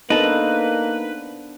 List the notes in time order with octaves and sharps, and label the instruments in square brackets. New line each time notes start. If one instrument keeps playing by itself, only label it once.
[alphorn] A#3 [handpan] B3 D4 C5 [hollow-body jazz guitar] D#4 A4 [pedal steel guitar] B4